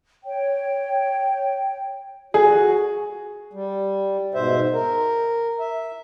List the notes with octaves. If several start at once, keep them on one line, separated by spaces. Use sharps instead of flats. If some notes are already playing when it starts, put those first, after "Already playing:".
C#5 G5
F#4 G#4
G3
G#2 B2 C5 E5
A#4
E5